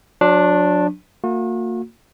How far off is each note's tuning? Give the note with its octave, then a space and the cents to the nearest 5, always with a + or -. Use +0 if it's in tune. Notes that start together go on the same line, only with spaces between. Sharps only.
F#3 -35 D4 +0 C#6 -45
A#3 -35 F#4 -40